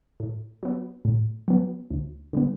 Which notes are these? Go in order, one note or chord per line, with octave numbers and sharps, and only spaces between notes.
A2
F#3 B3
A2
F#3 B3
D2
D3 G3 B3